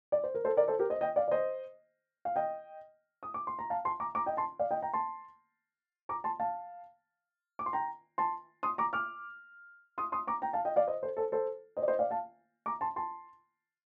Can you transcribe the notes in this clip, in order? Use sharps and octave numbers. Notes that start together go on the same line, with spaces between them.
D5
C5
A#4
A4 C5
A#4 D5
A4 C5
G4 A#4
C5 D#5
D#5 G5
D5 F5
D5
C5 D#5
F5
D#5 G5
D#6
D6
C6
A#5
F5 A5
A5 C6
A#5 D6
A#5 D6
D#5 G5
A5 C6
D5 F5
D#5 G5
G5 A#5
A5 C6
A#5 D6
A5 C6
F5 A5
D6
C6
G5 A#5
A5 C6
C6 D#6
A#5 D6
D6 F6
C6 D#6
C6 D#6
A#5 D6
G5 A#5
F5 A5
D#5 G5
D5 F5
C5 D#5
A4 C5
A4 C5
A4 C5
C5 D#5
D5
C5 D#5
D5 F5
F5 A5
A#5 D6
A5 C6
A5 C6